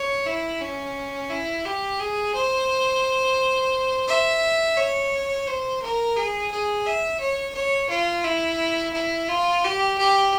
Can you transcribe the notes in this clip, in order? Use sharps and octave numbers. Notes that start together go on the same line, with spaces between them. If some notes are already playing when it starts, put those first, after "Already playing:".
Already playing: C#5
E4
C#4
E4
G4
G#4
C5
E5
C#5
C5
A#4
G#4
G#4
E5
C#5
C#5
F4
E4
E4
F4
G4
G4